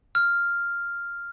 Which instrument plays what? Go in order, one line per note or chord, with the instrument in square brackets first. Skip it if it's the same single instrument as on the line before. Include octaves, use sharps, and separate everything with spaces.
[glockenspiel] F6